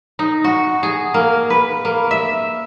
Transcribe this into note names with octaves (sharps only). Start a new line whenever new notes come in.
D#4
F#4
G#4
A#3
B4
A#3
E5